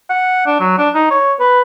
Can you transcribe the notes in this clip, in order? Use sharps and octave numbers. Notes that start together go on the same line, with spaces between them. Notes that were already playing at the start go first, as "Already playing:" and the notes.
F#5
D4
F#3
D4
D#4
C#5
B4